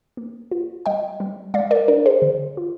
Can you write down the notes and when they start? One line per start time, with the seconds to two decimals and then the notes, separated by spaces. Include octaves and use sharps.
0.17 A#3
0.51 F4
0.86 G3 D#5 G5
1.20 G3
1.54 G#3 D5 F5
1.71 A#4 D5
1.88 D4 A#4
2.06 G#4 C5
2.22 D3
2.57 F4